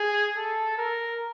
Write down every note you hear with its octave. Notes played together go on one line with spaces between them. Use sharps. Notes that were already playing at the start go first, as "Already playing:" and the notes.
Already playing: G#4
A4
A#4